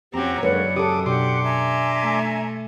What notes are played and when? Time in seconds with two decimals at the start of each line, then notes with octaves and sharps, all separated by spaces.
0.14 F2 C4 C#4 F#4 G4 A#5
0.43 F#2 D3 G#3 A#3 B4 C#5 D5 F#5
0.76 C#3 G4 A4 D6 D#6
1.06 B2 D4 G4 F#5 C6 D6
1.43 E5 G#5 A#5
2.01 A3